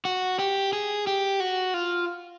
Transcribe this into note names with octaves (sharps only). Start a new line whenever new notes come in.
F#4
G4
G#4
G4
F#4
F4